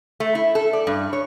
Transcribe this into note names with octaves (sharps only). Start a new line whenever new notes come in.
A3
E4
A4
D5
G2
C#5